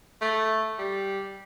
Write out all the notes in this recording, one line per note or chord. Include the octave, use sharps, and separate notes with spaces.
A3
G3